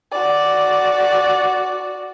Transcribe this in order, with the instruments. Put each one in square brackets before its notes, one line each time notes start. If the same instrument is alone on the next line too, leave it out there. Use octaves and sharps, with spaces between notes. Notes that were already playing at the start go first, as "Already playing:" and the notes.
[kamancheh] F#4 D5